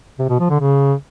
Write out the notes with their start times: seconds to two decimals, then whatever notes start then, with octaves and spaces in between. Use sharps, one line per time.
0.19 C3
0.29 B2
0.40 F3
0.50 D3
0.60 C#3